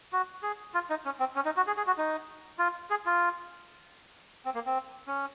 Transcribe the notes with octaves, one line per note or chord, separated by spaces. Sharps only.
F#4
G#4
F4
D#4
C#4
C4
C#4
D#4
F#4
G#4
G#4
F#4
D#4
F4
G#4
F4
C4
A#3
C4
C#4